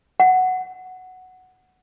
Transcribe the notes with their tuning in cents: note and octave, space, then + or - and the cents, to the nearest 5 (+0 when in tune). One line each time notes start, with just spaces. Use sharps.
F#5 +0